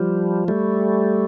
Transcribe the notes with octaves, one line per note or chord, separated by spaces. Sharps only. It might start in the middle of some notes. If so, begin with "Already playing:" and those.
Already playing: F3 G3
G3 A3